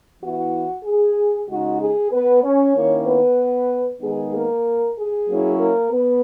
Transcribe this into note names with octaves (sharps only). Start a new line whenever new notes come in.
E3 B3 E4 F#4
G#4
C#3 G#3 D#4 F#4
G#4
B3 B4
C#4 C#5
D#3 A#3 C#4 E4
B3 B4
D#3 G#3 B3 D#4 G#4
A#3 A#4
G#4
F#3 A#3 C#4 E4
A#3 A#4
B3 B4